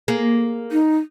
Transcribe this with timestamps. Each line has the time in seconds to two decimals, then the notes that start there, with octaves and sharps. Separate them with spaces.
0.08 A#3 G#4
0.72 D#4